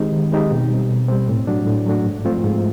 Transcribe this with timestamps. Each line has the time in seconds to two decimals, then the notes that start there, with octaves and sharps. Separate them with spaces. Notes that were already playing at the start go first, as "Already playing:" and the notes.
Already playing: D#3 G#3 C4 D#4 G4
0.12 D#3
0.32 G#3 C4 D#4 G4
0.51 B2
0.70 G3 C4
0.89 B2
1.08 G3 C4
1.28 A2
1.47 F#3 A3 D4 F#4
1.67 A2
1.86 F#3 A3 D4 F#4
2.05 G#2
2.25 F3 A3 C4 F4
2.44 G#2